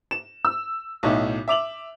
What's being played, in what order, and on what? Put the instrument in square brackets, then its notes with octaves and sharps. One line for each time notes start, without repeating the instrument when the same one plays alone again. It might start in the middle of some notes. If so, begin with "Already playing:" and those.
[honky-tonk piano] E7
E6
B1 A2 D#4 E4
E5 D6 F7 F#7